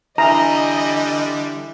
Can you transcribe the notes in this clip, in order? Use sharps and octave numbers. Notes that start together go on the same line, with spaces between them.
D3 E3 G3 D#5 A#5